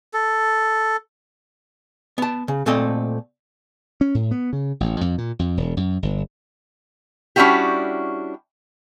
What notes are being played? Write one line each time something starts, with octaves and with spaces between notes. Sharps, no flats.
A4
B3 A5
C#3
A#2 A3 C4 A4 D#5
C#4
A2
B3
C#3
A1
F2
A#2
F2
E1
F#2
G1
G3 C#4 D4 E4 F#4 G4